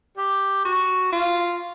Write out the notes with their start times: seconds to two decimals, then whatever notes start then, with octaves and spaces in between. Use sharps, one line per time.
0.17 G4
0.65 F#4
1.12 F4